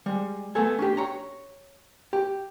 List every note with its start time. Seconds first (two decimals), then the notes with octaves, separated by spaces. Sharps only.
0.06 G3 G#3
0.55 A3 B3 A4 G#5
0.79 C#4 D4 G4
0.97 C#5 A#5
2.13 G4